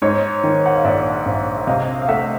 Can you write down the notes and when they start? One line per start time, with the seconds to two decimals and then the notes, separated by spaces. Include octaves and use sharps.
0.02 G#2 C#5 D#5
0.44 D#3
0.66 F#5
0.75 F5
0.85 A#1 D5 E5
1.26 A#1
1.67 C3 D#5 F5
2.02 F5
2.09 A3 E5 F#5